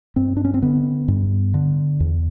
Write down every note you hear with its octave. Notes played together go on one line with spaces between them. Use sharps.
G2 C4
D4
C#4
C4
D3 B3
G2
D3
E2